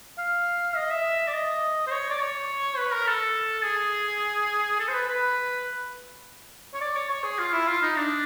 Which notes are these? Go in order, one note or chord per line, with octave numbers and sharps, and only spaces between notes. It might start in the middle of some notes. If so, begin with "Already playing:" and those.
F5
D#5
E5
D5
D#5
C5
C#5
D5
C#5
B4
A#4
A4
G#4
A4
C5
B4
B4
C#5
D5
C#5
C#5
G#4
F4
E4
F4
D#4
D4